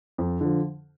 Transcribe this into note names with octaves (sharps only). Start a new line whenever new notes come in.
F2
D3 F3